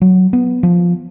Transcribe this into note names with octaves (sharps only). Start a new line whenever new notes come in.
F#3
B3
F3